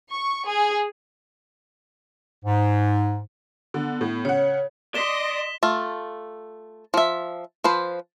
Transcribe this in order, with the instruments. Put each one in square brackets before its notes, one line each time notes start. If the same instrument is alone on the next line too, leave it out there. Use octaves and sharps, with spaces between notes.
[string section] C#6
G#4
[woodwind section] G#2
[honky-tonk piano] D3 [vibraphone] B3
[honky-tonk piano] A2
[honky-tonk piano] C#3 F#5 [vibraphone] C#5
[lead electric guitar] D5 [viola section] D#5 C6 [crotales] B6 E7 G7
[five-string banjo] A3 F4
F3 E5
F3 B4 C5